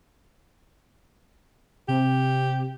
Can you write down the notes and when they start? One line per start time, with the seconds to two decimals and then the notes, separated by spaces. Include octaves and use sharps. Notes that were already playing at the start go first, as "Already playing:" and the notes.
1.88 C3 G4